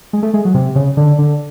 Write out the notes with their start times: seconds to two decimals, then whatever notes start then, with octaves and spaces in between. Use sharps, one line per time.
0.13 G#3
0.23 A3
0.34 G#3
0.45 F#3
0.54 C3
0.75 C#3
0.97 D3
1.18 D3